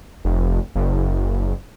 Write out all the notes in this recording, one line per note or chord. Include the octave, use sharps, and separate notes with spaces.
F1
F#1